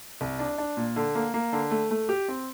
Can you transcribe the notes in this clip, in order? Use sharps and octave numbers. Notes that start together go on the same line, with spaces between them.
C2
D4
D4
A#2
D3
A#3
A#3
D3
A3
A3
G4
C4